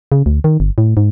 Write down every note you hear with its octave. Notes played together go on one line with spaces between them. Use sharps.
C#3
D2
D#3
G1
A2
G#2